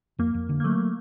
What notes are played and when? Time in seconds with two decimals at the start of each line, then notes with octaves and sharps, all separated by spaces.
0.19 F2 A#3
0.34 F2
0.49 D3
0.60 A#3
0.64 F#3 A3